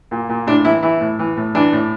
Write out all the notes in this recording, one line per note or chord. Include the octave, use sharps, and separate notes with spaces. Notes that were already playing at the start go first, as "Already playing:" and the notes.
A#2
A#2
A2 D4
E3 E4
E3 E4
A2
E3
A2
E3 D4
A2